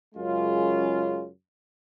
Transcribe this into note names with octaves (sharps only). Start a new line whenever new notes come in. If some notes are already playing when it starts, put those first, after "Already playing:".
F#2 C#3 G#3 C#4 F4